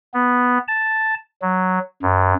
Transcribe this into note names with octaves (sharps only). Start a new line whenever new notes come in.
B3
A5
F#3
F#2